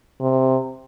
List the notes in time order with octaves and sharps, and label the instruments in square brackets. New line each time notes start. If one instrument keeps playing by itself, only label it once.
[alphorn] C3